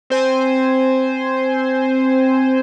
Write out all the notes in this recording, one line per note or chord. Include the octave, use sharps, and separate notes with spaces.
C4 C5 G#5